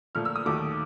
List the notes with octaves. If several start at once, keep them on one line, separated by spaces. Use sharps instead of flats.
A#2 F3 A3 F6
E6
D#6
D#2 D#3 F#3 A3 D6